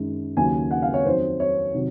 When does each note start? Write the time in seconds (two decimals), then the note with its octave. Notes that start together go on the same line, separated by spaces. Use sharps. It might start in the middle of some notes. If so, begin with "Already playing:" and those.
Already playing: F#2 D#3 G#3
0.37 D#2 C#3 F#3 G#5
0.71 F#5
0.82 F5
0.94 C#5
1.06 F2 D#3 F#3 C5
1.40 C#5
1.74 C3 D#3 F#3